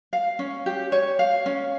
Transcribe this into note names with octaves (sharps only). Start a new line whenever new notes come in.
F5
C#4
G4
C#5
F5
C#4